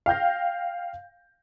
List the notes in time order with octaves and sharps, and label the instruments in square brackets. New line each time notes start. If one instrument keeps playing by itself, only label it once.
[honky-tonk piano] F5 G5 G6 A#6